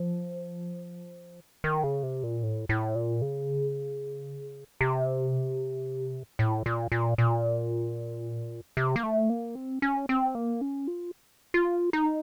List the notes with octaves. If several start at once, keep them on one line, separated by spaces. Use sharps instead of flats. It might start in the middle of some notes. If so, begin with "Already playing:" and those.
Already playing: F3
D#3
C#3
C3
A#2
A2
A2
A#2
C#3
C3
A2
A#2
A#2
A#2
C3
A#3
A3
A#3
C4
C#4
C4
A#3
C#4
F4
F4
D#4